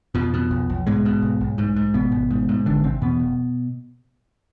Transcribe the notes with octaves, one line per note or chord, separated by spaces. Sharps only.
F2 B2 F3
B2
B1
B1
G#2 B2 G#3
B2
B1
B1
G#2
G#2
G#1 B2 B3
G#1
G#2
G#2
G#1 D3 D4
G#1 C3 C4
E2 B2 B3
F1